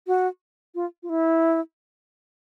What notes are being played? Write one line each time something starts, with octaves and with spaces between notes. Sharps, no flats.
F#4
F4
F4
E4